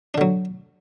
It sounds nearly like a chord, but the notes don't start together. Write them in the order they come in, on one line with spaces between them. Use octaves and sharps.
D4 D3 F#3